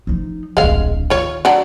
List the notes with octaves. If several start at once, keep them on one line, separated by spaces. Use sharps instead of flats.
F3 D#4
D1 A#1 G#3 F5
D#3 F4 C#5
F#3 D4